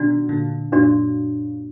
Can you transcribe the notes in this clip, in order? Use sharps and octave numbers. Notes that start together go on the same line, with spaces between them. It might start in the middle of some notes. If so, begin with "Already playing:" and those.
Already playing: B2 D#3 D4 F#4 D5
A#2 D3
F#2 A#2 D4 F#4 D5